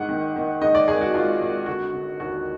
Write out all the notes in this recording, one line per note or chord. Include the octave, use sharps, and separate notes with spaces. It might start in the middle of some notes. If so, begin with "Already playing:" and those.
Already playing: G#1 G#2 F#5
D#3
D#3
G#2 D#5
D5
G#1 G#4
F#4
G#1 F4
G#1
D3 F#4
D3
D#2 F#4